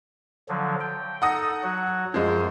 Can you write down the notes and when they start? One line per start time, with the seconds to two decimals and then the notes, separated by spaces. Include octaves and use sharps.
0.49 D3 F3 F#3
0.80 G5
1.22 D#4 A4 F#5 D#6 A#6
1.63 F#3 F#4
2.14 F#2 F3 G#3 C5